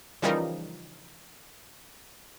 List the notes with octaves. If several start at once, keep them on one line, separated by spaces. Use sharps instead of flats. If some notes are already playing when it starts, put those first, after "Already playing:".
C#3 E3 F3 G3 D#4 A#4